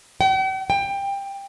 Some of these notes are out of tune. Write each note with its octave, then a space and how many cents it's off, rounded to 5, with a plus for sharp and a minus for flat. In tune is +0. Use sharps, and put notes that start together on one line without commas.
G5 -45
G5 +20